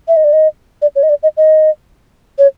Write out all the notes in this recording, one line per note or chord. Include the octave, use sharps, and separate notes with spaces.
E5
D#5
D5
D#5
D5
C#5
D#5
D5
D#5
D#5
C#5